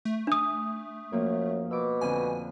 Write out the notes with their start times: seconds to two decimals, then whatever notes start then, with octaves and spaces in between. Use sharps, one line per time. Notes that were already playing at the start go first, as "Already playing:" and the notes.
0.05 A3
0.27 D4 D#6
1.12 F#2 F3 A#3
1.71 B2 D6 E6
2.01 F2 D3 C4 G#5